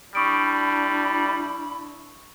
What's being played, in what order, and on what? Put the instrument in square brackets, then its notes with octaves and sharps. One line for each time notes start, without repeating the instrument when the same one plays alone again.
[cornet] G3 [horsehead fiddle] D4 E4 [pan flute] B5 [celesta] C#6 D#6 D7